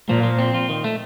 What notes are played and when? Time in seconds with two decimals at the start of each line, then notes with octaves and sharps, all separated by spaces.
0.09 A#2 F3
0.23 F3
0.39 C4
0.54 F4
0.69 D#3
0.84 A3